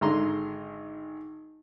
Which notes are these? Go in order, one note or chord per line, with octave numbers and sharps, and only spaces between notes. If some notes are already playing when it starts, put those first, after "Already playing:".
G#1 D3 G#3 A#5 C6